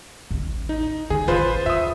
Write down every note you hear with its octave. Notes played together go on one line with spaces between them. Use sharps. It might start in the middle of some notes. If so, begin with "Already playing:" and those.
A1 D#2
D#4
D#3 G#4
A1 F2 F4 B4 C5
F2 E5 D#6